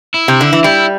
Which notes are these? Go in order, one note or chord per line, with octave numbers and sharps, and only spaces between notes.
E4
C3
D3
E3
G3 E4